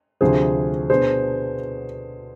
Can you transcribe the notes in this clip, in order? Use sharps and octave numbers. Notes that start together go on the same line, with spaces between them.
D2 C3 F3 G#4 C5
B2 B3 D4 G#4 C5